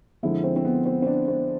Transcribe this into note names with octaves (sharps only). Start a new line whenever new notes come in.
F2 D3 F3 G#3 E4
C4
C4
B3
C4
C4
D4
C4